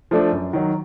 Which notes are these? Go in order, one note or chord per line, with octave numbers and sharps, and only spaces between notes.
F3 A3 D4
F#2
D#3 F#3